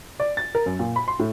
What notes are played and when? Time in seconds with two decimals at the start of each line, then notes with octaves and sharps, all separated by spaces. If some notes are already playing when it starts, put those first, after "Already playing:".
0.20 D5
0.37 A6
0.55 A#4
0.66 F#2
0.79 A#2
0.96 B5
1.08 C6
1.19 A2